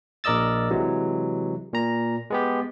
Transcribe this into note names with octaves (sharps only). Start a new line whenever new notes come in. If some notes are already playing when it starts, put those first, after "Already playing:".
A#1 A#4 D5 D#5 E6 A6
C3 E3 F#3 G#3
A#2 A#5
G#3 B3 G4